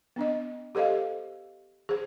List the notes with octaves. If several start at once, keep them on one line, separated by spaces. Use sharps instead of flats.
B3 D4 D#5
G4 A4 C5 D#5 F5
G#4 C5